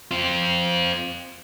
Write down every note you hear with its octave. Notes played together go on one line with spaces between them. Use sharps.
C4 F4